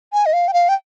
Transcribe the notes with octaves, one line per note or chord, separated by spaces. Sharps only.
G#5
D#5
F5
G5
F5
G5